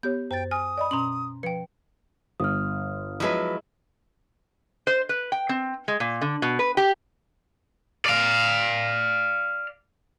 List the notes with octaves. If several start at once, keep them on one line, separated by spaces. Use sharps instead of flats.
B3 G4 C#5 G6
F#2 C5 G5 A6
G#5 D#6 F6
D5 D#5 B5
B2 C#4 A#5 C6 F#7
F3 B4 G5 C#7
G1 D#6 F6
F3 F#3 G#3 E4 B4
C5
B4
G5
C4
G#3
A#2
D3
B2
B4
G4
D5 F5